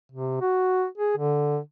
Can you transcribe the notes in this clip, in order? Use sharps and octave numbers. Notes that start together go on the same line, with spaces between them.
C3
F#4
G#4
D3